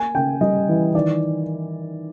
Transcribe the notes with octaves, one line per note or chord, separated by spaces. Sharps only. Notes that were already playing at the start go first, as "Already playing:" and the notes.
Already playing: A#3 G#5
C#3 G5
G3 D#5
E3
D#3 D5